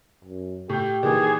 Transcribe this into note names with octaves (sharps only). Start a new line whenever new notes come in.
F#2
A2 G4 G6
A#2 D#3 E3 G#4